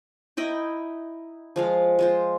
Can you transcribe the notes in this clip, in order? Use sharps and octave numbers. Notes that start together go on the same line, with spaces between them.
D#4 E4 D#5 G5
F3 G#3 F5
G#3 F4 C5